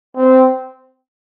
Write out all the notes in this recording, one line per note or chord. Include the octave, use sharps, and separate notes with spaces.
C4